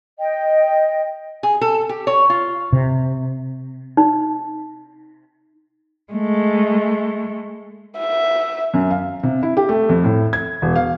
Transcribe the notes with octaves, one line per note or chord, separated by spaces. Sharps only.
D#5 G5
G#4
A4
G4
C#5
F4
C3
D#4
G#3 A3
E5
F#2
F5
C3
E4
G4
A3
F2
A2
G#6
E1
F5